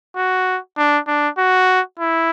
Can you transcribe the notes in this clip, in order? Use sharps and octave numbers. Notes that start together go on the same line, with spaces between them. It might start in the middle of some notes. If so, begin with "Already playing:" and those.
F#4
D4
D4
F#4
E4